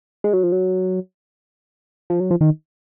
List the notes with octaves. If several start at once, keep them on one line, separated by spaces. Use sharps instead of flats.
G#3
F#3
F3
F#3
F3
F#3
F3
D#3